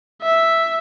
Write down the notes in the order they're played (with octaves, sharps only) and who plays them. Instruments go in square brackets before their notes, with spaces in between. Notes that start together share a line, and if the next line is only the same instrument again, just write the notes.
[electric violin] E5